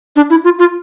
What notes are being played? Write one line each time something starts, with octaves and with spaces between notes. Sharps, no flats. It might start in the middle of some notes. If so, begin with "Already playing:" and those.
D4
E4
F4
F4